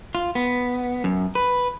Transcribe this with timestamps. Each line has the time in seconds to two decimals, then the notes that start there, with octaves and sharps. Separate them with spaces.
0.15 F4
0.35 B3
1.04 F#2
1.35 B4